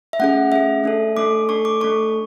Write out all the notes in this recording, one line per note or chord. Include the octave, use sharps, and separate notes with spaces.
E5
A3 C#4 G#4 F#5
A3 C#4 G#4 E5
A3 D4 A4
A3 D4 A4 D6
A3 D4 A4 C#6
D6
A3 D4 A4 C#6